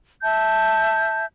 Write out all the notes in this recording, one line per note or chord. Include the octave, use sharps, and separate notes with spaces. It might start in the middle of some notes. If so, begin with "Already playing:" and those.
E5 A5 G6